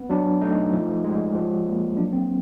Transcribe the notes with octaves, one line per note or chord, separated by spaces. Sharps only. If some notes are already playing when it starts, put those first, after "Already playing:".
Already playing: B3
F#3 D4
A3 D#4
F3
G#3
F3
A#3
F#3 D4
C4